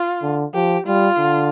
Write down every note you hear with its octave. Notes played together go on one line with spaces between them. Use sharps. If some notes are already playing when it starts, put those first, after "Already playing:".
Already playing: F4
D3
F3 G4
G3 F4
D3